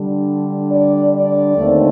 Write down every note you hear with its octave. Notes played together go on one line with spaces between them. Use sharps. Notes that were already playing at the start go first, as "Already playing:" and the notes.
Already playing: D3 G3 D4
D5
D5
D#2 D3 A3 C4 D#4